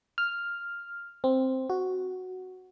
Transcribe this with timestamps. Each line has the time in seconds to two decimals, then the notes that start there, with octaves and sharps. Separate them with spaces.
0.18 F6
1.24 C4
1.70 F#4